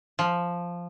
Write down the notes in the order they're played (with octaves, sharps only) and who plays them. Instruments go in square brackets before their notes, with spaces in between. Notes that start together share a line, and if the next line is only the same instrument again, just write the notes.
[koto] F3